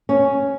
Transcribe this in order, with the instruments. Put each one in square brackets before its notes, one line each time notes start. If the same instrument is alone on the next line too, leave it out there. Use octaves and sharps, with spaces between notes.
[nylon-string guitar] C#4